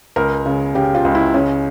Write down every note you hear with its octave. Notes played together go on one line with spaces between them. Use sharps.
C#2 A#4
C#3
C#3 G4
F4
C#2
E4
C#3 C#4